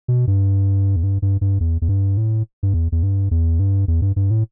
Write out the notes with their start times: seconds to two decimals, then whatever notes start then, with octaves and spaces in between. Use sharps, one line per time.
0.08 B2
0.27 G2
0.96 E2
1.03 G2
1.22 G2
1.41 G2
1.60 E2
1.82 E2
1.89 G2
2.17 A2
2.63 G2
2.74 E2
2.92 E2
3.03 G2
3.31 E2
3.59 G2
3.88 E2
4.02 G2
4.16 G2
4.31 A2